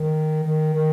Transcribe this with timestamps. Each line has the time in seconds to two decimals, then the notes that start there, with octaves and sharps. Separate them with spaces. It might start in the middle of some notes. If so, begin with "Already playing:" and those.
Already playing: D#3
0.44 D#3
0.73 D#3